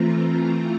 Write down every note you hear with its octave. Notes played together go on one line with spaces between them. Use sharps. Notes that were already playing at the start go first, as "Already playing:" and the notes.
Already playing: E3 A3 C4 F4 A#5